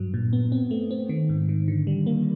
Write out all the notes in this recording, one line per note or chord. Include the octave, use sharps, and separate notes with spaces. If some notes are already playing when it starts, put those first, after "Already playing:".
Already playing: G2 F#3
A#2
B3
C4
A3
C4
D#3
G#2
D#3
D3
G3
A#3